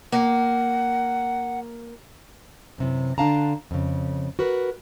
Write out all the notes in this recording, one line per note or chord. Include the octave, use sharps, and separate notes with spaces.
A#3 F#5
F#2 C3 E3
D3 D4 F5 A5 A#5
F2 C#3
F#4 A#4 B4